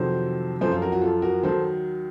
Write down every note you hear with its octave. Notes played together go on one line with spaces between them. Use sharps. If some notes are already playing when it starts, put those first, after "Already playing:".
Already playing: F2 C3 D#3 F#3 A4 C5
F#2 F3 A4 C5
F4 A4
F#4 A#4
F#4
F4 A4
F#4 A#4
D#2 D#3 F#3 A4 C5